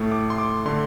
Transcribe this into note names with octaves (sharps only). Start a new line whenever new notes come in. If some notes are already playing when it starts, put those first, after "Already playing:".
Already playing: A2 A3
D6
C6
D6
D3 A3 C6